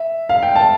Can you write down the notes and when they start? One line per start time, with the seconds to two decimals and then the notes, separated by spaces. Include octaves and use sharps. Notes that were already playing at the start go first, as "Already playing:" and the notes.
Already playing: E5
0.29 F5
0.43 G5
0.55 A5